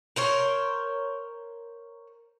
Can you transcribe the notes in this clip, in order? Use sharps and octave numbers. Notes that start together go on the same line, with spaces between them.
A#4 C5 C#5